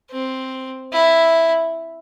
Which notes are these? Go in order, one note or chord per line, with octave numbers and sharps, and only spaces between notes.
C4
E4